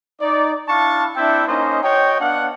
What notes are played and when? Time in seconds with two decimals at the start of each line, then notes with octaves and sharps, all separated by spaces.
0.21 D#4 D5
0.68 D4 E4 F5 A5 C#6
1.15 C4 D4 E4 E5 G5
1.46 A#3 C#4 D#4 C5 D#5
1.82 F#4 C#5 D#5 G5
2.20 B3 D4 F5 F#5